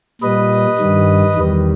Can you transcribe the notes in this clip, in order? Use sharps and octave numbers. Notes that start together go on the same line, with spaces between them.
A#2 G3 B4 D#5
G2 D#3 G3
E2 D#3 G3